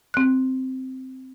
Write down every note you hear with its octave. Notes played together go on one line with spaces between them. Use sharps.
C4 F#6